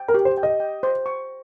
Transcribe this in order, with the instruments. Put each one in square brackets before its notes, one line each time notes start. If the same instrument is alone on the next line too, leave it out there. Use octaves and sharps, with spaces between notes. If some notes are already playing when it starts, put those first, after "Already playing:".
Already playing: [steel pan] G5
[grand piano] A#4
[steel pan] G4
[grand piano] C5
[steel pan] G5
[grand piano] D#5
[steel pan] G5
C5
C#6